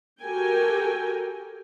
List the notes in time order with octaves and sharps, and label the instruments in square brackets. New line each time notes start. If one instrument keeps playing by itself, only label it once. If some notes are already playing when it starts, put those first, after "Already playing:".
[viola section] F#4 G4 A4 A#4 G5 G#5